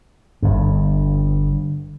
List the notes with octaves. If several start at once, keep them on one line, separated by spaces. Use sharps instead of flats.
G1 G2